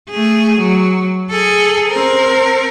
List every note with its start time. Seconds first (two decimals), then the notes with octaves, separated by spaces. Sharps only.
0.10 A3 G#4
0.59 F#3
1.31 G#4 A4
1.90 C4 A#4